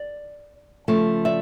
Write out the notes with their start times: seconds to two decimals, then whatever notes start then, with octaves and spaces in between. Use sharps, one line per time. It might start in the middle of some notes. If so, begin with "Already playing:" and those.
Already playing: D5
0.88 C#3 F3 A3
1.25 D5 E5